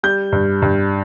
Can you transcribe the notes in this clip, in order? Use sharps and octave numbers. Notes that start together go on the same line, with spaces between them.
G3 G6
G2
G2